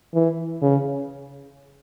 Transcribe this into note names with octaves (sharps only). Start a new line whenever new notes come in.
E3
C#3